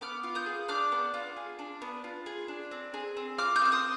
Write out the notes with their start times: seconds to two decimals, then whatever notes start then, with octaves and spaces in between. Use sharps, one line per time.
0.01 B3 D6 F6
0.24 F4
0.35 D#6 G6
0.46 G#4
0.68 D4 D6 F6
0.92 B3
1.14 F4
1.37 G#4
1.59 D4
1.82 B3
2.04 F4
2.26 G#4
2.48 D4
2.71 C4
2.94 G#4
3.17 C4
3.38 F4 D6 F6
3.56 D#6 G6
3.62 C4 F6
3.72 C6 D#6